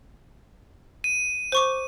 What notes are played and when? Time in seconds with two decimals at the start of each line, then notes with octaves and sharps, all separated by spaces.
1.04 D#7
1.52 C5 C#6 D6